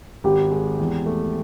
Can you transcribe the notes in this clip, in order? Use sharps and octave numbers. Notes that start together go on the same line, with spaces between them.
G#1 G4
G#3
E2
A3